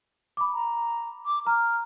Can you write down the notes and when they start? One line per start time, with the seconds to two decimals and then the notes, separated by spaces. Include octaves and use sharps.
0.37 B5 D6
0.54 A#5
1.25 D6
1.47 A#5 F6